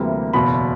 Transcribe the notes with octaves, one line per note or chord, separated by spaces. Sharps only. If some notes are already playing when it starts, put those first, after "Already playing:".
Already playing: D2 C3 E3 G3 A#3
F#1 E2 B2 B5